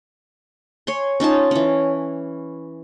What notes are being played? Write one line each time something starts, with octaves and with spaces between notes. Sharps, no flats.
C#5 G#5 C6
C#4 D#4 F4 A5
E3 C#4